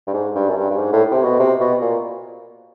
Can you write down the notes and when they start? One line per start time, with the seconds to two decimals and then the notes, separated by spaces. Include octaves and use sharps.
0.07 G2
0.14 G#2
0.35 G2
0.49 F#2
0.56 G2
0.70 G2
0.77 G#2
0.92 A2
1.12 C3
1.23 B2
1.39 C3
1.60 B2
1.81 A#2